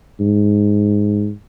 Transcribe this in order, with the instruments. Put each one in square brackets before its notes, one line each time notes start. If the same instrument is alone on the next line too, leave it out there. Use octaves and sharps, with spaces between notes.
[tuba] G#2